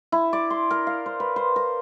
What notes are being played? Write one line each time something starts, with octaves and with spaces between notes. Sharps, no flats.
E4
D5
C6
A#4
F5
C5
B4
C5
A#4